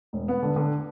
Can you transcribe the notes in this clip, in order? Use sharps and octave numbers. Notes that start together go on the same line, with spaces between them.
E1
B3
D3
D3